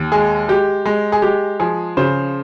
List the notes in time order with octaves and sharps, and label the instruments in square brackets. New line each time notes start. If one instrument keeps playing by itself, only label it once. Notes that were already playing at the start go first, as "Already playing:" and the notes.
Already playing: [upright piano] D#2
G#3 G#4
G#3 G4
G#3
G#4
G#3 G4
F3 G#4
C#3 C5